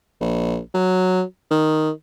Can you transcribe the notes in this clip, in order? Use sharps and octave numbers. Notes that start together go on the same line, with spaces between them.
A#1
F#3
D#3